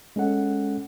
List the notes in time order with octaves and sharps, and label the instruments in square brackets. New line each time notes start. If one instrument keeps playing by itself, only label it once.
[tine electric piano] G#3 C#4 A4 F#5